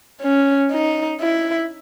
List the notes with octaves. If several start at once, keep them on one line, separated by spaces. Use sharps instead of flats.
C#4
D#4
E4